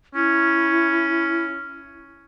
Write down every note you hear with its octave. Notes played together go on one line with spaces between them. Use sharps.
C#4 E4